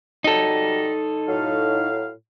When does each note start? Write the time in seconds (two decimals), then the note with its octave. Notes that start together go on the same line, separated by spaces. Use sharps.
0.24 F#3 G3 D#4 A4 A#5
1.28 A2 F#3 F5